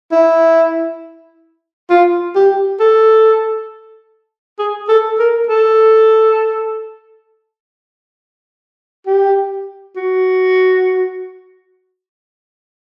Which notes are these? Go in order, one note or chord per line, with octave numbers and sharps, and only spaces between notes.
E4
F4
G4
A4
G#4
A4
A#4
A4
G4
F#4